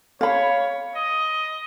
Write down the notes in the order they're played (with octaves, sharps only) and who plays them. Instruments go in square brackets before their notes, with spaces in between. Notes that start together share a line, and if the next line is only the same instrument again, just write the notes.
[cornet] C#5 [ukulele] F5 B5
[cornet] D#5